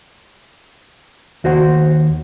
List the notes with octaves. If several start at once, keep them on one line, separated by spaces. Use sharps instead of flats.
D#2 F#4 C5 F#5